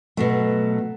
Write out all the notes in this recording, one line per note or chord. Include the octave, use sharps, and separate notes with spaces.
B2 F#3 A3